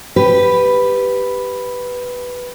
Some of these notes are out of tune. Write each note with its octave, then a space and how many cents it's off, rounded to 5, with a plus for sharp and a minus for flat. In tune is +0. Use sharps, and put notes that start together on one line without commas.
G4 +0 B4 +0